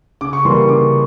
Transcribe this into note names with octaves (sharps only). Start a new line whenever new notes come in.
C#3 D6
C#6
E3 G3 A#3 C6
C#6
C#3 D6